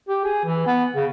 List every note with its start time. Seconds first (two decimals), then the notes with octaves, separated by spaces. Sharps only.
0.09 G4
0.24 G#4
0.45 E3
0.66 B3
0.96 C#3